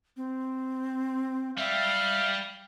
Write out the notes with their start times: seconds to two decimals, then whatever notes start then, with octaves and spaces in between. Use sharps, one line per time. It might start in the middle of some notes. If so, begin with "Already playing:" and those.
0.17 C4
1.58 G3 E5 F5